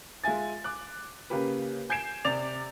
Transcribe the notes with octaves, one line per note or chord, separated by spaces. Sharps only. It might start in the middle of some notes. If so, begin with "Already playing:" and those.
G#3 F4 E5 G#5 A6
D6 F#6
C#3 A#3 G4 B4
G#5 G6 G#6 C7 D7 E7
C3 D5 A6 F7